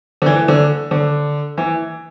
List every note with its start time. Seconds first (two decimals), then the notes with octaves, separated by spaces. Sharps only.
0.22 D3
0.26 E3
0.48 D3
0.91 D3
1.58 E3